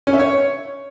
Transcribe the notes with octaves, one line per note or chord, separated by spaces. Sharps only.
C#4
E5
C#5